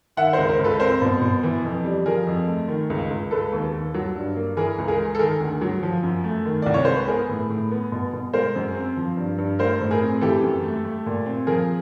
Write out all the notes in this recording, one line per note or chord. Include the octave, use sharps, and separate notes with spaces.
D#3 E5 F#5
C#2 A#4 C5
A#4 C5
C#2
A4 B4
C4 A#4 C5
B2
B2
E3
F2
G3
F3 G#4 A#4
F2
A3
D#3
C#2
C#2
G#3 A4 B4
D#2
D#2
F#3
G2
A#3
E3 G#4 A#4
C#2
G#4 A#4
G#3
A4
D#3 G#4 A#4
D2
F#3
F3
F#2
A3
D#3
C2 D5
C#5
G#3 C5
B4
B3 G#4 A#4
A2
A2
B3
B2
B2
G#3 A#4 C5
F#2
C4
F3
G2
G2
A3 A#4 C5
A2
G#4 A#4
C4
E3 G4 A4
F#2
A3
A3
A#2
C4
F3 G#4 A#4